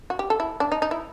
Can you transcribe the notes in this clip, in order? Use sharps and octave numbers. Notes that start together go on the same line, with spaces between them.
F#4
G4
A4
E4
D4
D#4
D#4
E4